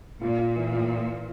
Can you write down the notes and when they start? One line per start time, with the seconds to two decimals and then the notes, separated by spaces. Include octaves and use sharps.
0.21 A#2 F4
0.39 F4
0.56 E3
0.73 F4